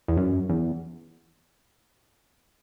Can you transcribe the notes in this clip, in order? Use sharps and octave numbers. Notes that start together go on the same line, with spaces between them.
E2
F#2
E2